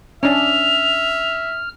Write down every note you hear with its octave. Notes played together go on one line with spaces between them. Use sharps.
C#4 D4 E5 F6 F7